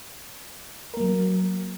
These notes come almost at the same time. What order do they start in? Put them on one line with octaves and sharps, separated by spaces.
A#4 A#3 F#3